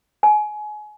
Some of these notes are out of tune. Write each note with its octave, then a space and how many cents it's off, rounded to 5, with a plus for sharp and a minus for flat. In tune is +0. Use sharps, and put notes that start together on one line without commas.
G#5 +25